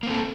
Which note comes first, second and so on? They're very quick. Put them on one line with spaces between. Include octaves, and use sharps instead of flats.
A#3 C4 A4